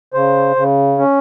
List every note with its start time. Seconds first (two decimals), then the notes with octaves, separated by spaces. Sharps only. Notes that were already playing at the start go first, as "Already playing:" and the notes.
0.14 C#3 C5
0.56 C#3
0.98 C#4